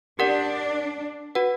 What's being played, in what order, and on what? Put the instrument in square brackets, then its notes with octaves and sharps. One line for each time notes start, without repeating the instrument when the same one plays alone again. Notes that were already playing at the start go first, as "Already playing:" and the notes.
[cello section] D4 [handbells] G4 A#4 D5 F#5
[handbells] F#4 B4 F#5